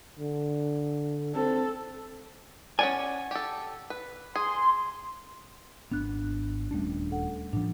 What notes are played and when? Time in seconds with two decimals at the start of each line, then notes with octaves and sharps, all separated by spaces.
0.19 D3
1.35 C4 A4
2.79 C#4 D5 F#5 G#5
3.31 G4 A4
3.90 B4
4.36 G#4 C6
5.91 G#1 B3 D4 F#6
6.71 D#1 G3 A3 C#4 D4
7.11 A4 F#5
7.53 A2 F3 D4